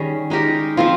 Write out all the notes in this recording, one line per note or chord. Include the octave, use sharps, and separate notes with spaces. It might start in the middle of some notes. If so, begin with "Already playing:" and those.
Already playing: D#3 G3 C#4 G#4
G#3 D#4 G4 A#4
F3 C4 F4